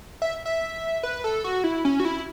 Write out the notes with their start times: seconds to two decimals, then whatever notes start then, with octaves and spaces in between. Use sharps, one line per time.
0.22 E5
0.45 E5
1.03 B4
1.24 A4
1.44 F#4
1.64 E4
1.85 C#4
2.00 F#4
2.05 E4